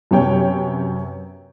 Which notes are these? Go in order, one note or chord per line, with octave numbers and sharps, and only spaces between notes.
F#2 C3 B3 C#5 G5